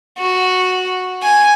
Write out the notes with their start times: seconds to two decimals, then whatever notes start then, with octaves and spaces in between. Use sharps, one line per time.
0.19 F#4
1.23 G#5